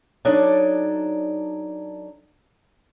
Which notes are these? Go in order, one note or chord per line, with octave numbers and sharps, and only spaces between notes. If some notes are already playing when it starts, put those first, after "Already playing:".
F#3 D4 D#4 A4 C#5 D5